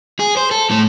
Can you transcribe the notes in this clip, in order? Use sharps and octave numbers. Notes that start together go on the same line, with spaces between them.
G#4
C5
A4
A2 A3